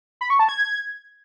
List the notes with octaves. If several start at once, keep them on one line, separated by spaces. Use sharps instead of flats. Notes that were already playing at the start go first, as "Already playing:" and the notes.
B5
C#6
A5
G#6